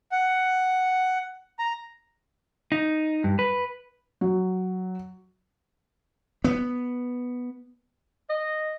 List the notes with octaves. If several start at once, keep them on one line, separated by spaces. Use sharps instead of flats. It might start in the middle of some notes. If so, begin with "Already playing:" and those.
F#5
A#5
D#4
G2
B4
F#3
B3
D#5